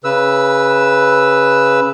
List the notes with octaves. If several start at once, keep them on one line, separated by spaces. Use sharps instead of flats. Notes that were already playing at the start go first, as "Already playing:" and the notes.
C#3 B4 E6